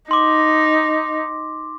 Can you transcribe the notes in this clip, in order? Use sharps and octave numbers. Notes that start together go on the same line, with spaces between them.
D#4 C6 D6